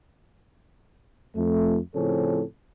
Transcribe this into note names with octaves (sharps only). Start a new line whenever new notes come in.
F2 A3
A2 C#3 F3 C4 C#4 A4